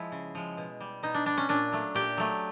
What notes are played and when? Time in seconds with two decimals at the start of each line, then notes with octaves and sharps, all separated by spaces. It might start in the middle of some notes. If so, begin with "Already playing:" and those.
Already playing: F3 G#3 E4
0.12 C#3
0.35 F3 G#3
0.57 B2
0.80 G3
1.03 B2 D#4
1.14 D4
1.26 G3 D4
1.37 C#4
1.49 A#2 D4
1.72 F#3 A3
1.95 A#2 G4
2.17 F#3 A3